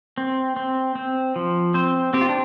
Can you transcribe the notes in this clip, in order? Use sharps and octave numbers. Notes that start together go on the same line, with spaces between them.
C4
C4
C4
F3
C4 C5
C4 G4
F4
D4